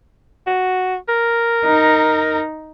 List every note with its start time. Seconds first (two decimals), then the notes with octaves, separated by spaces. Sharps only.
0.47 F#4
1.09 A#4
1.65 D#4